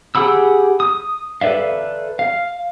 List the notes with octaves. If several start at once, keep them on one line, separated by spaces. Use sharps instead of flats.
G4 G#4 F#5 B5 E6
D#6
A4 B4 D5 E5 F5
F5